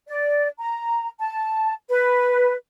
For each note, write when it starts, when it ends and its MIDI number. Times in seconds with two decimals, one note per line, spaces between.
0.07 0.48 74
0.59 1.09 82
1.20 1.72 81
1.89 2.53 71